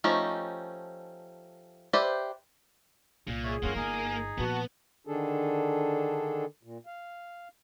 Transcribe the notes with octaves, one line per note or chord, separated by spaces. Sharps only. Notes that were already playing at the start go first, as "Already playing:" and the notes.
F3 A3 C#4 D#4 G4
G4 B4 C5 D5 E5
C2 A#2
G#4 C#5 E5 C#6
F#2 A#3 C#4 D4 F4 F#5
G1 D#4 G#4 G#5
A#2 F3 B3 F#4 A5
D3 D#3 D4 G#4 A4
A#2
F5